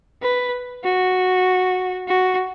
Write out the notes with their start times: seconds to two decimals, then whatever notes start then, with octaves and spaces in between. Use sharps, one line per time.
0.22 B4
0.84 F#4
2.08 F#4